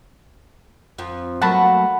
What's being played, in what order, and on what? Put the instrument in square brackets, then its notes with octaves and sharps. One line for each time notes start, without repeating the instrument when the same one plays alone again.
[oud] F2 F3
[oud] F#3 A3 A#3 [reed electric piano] F#5 A5 B5